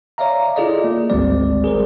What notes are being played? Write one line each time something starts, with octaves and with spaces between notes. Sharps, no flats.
C#5 D5 E5 F5 A#5
E4 F4 G#4 A4 D5 D#5
A#3
G#1 D2 G3 G#3 C4 D5
G#4 A#4 C5